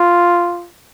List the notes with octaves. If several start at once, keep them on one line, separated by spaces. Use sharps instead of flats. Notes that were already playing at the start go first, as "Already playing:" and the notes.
Already playing: F4